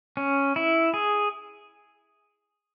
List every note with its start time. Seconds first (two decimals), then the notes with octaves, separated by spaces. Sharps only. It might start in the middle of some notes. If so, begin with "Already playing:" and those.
0.17 C#4
0.56 E4
0.94 G#4